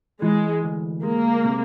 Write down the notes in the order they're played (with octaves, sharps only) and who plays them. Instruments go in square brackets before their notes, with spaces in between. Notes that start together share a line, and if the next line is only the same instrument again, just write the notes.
[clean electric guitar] E3 [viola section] G#3
[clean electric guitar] D2
[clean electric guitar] G#3 [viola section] A#3
[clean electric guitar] C3